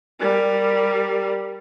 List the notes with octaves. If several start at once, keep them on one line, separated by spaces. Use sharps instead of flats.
G3 A#4